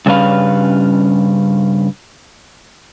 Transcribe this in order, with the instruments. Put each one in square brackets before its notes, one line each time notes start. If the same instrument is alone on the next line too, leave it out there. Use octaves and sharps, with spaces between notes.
[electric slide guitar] G2 C#3 G3 C#4 B4 F5